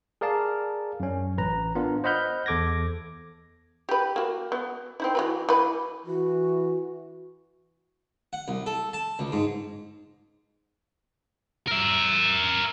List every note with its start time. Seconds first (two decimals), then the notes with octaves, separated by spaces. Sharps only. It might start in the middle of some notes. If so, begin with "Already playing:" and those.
0.21 G#4 A#4 D5 F5 A5
1.00 F#2 C#4
1.38 A1 B4 A#5
1.75 B3 D4 F4 A#4
2.04 C5 D#5 F#5 B5 F6 G6
2.46 E2 A4 D6 G#6 A#6
3.89 G4 B4
4.16 A#3 F#4
4.52 B3
5.00 C4 D#4 E4
5.15 E3 F#4 B4
5.49 E3 B4
6.07 E3 F#4
8.33 F#5
8.48 C2
8.66 A4
8.93 A5
9.19 C#2
9.32 G#2
11.67 A#4 E5